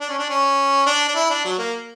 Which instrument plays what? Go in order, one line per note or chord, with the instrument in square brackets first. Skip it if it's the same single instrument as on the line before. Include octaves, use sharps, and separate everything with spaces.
[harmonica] D4
C#4
D4
C#4
D4
D4
E4
D4
F#3
A#3